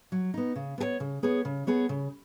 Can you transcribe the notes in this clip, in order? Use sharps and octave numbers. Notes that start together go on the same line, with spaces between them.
F#3
B3 D#4
C#3
B3 G#4 C#5
C#3
B3 G#4 C#5
C#3
B3 G#4 C#5
C#3